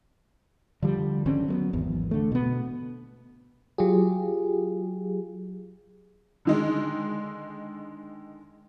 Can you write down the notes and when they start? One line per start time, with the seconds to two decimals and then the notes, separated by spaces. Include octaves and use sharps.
0.82 D3 F3 G3
1.26 G#1 D3 C4 C#4
1.48 F#3 A3 B3
1.73 G#1 E2
2.11 D3 A3
2.32 B2 B3
3.78 F#3 F4 G4 G#4
6.45 D3 D#3 G#3